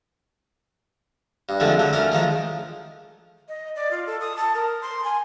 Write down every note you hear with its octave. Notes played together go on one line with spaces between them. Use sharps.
G2
D3 F3 G#3 A3 C4
D3 F#3
A3 C#4 A#4
D#3 F3 G#3
D#5
D5
F4
A4
D#6
A5
A#4
C6
G#5